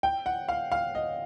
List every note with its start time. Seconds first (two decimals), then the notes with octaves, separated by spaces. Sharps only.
0.03 G5
0.26 F#5
0.49 F5
0.72 F5
0.95 D#5